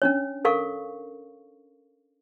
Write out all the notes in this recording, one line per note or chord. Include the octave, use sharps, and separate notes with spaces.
C#4 D4 C#5
A4 A#4 F5 C#6